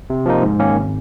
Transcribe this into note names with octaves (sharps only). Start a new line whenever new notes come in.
C3
F3 A#3 D#4
G#2
D#3 A#3 C#4
G#1